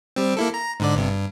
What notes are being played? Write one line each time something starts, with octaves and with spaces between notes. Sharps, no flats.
G3 C4
A#3 E4 A4
A#5
G#2 D3 D5
G1 G2 C3
G2